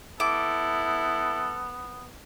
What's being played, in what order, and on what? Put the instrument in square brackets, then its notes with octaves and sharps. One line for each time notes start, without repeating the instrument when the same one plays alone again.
[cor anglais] B3 [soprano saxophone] E4 [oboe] A4 [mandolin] D6